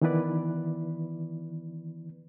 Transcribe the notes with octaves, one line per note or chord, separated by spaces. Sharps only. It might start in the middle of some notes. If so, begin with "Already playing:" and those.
D#3 E3 B3 E4 B4 D5